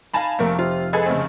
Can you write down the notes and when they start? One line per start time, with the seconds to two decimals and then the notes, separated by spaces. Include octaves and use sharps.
0.13 D#4 F5 G#5 A5 B5
0.39 F1 A3 A#3 A#4 B6
0.59 C3 F4
0.93 G#3 G#4 A4 B4 G#6
1.06 C#3 A3 C4